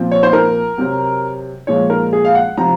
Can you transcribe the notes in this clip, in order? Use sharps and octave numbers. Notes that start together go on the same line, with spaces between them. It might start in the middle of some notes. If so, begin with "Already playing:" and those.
Already playing: A#2 F3 C4
C#5
C5
A#4
C3 F#3 C4
A#2 F3 G#3 C#5
A#4
G#4
F5
F#5
C3 F3 C4 A#5